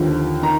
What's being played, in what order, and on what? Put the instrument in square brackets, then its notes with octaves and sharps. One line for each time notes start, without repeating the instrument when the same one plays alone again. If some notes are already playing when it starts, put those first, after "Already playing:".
Already playing: [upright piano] D#2 D3 F3
D#3 A#5